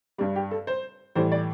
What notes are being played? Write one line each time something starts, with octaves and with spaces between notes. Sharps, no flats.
G2 G3 D4
G4
A4
C5
A2 E3 G3 C5
D5